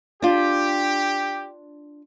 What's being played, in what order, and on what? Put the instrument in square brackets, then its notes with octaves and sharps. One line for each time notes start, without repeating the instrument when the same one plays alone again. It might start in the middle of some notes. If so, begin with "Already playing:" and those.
[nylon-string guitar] D4 F4 [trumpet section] G4